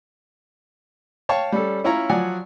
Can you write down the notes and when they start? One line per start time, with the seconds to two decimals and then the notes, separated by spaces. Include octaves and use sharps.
1.29 C#5 F5 G5 A5 C#6
1.52 G3 C#4 A4
1.84 C#4 E4 F4 C#5 A#5
2.09 F3 F#3 D5 F#5 G#5